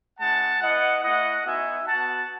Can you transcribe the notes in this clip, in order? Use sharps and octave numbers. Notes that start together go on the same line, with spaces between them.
G#3 C#4 E4 F#5 A5
B3 E4 D#5 F#5
A3 E4 D#5 F#5
B3 D#4 F#4 E5 G#5
B3 F#4 F#5 A5